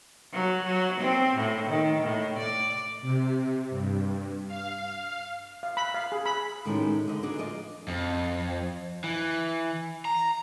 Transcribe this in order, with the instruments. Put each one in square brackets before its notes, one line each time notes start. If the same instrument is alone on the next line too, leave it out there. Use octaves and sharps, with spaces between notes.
[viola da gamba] F#3
F#3
C4
A2
D#3
A2
D5
[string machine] C3
G2
F5
[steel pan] F5
B5
F5
G#4
B5
[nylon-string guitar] A2 D#3 G#3 A3 C#4 F#4
D3 D#5
D4 D#4 F#4 G#4
F3 F4 D5 D#5
[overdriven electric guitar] F2
E3
A#5